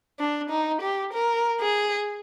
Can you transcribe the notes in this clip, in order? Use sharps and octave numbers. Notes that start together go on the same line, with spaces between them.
D4
D#4
G4
A#4
G#4